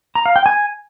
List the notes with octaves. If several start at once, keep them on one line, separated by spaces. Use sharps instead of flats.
A#5
F5
G5
G#5